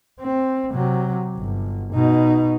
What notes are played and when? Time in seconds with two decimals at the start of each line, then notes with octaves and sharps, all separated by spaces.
0.21 C4
0.72 C3 F#3
1.37 G1
1.93 B2 D#4